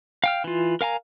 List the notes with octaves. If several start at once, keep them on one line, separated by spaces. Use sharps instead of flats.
F5 G5 F6
E3 F4
A#4 F5 G#5 A#5